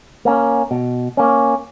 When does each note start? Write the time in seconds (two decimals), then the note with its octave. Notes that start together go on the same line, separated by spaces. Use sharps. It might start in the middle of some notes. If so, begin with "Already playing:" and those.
0.25 A#3 C#4
0.71 B2
1.17 A#3 C#4